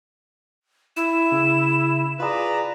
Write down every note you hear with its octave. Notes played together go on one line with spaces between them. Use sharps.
E4 E7
C#3
F4 G#4 B4 D5 A#5